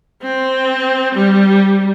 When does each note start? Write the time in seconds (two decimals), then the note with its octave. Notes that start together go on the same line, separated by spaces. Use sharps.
0.22 C4
1.15 G3